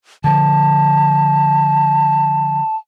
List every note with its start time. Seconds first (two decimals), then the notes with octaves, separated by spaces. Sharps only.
0.24 D3 F3 A5